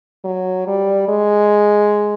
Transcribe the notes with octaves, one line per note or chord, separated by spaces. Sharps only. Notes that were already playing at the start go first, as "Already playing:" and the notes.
F#3
G3
G#3